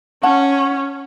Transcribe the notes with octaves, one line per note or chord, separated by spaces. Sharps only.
C#4 F#5 A5